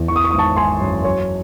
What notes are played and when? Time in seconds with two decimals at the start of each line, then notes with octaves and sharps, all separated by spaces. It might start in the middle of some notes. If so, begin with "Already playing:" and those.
Already playing: E2
0.08 E3 C#6
0.16 D#6
0.24 C#6
0.31 D#6
0.33 G#1
0.38 A5 C#6
0.56 G#1 G#5 C6
0.80 F#2
1.04 F#3 C#5